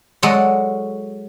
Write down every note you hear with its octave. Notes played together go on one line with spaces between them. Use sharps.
F#3 G#3 A4 D5 F#5